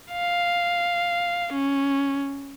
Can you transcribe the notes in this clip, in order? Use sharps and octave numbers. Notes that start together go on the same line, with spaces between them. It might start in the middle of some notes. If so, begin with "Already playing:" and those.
F5
C#4